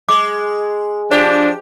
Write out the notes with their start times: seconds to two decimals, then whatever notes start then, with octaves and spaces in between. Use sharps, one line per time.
0.09 G#3 D6
1.11 F3 D4 G4 C5